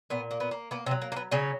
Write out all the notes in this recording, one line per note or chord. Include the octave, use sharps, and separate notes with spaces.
A#2 B3
A#3
B3
A#3
A#3 B3
C3 C4
F#3
A#3
A#3
B3
C#3 F#3 C#4